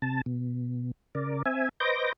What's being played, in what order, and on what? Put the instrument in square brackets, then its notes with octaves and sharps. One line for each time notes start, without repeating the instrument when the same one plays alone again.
[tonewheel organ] C3 A5
B2
C#3 A#4 D5
C4 E5 G#5
B4 C5 D#5 D6 G6 A#6